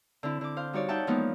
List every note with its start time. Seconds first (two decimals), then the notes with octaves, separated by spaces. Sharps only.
0.23 D3 C4 E4
0.41 D3 D6
0.56 C5 F5
0.73 G3 D#4 F#4 C#5 D5
0.88 D#4 E5 F#5 G5 A5 C#6
1.07 E3 F3 G#3 A#3 B3 D#4